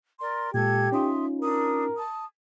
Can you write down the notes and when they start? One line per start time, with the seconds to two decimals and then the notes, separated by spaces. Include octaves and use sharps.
0.20 A#4 D5 C6
0.54 A#2 G#3 G4 A4 G#6
0.92 C#4 D#4 F4 E5 C6 D#6
1.42 D4 A#4 D#6
1.97 A5 D#6